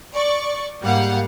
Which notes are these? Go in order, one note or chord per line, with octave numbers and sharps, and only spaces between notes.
D5 C#6
G#2 G3 A#3 F5 F#5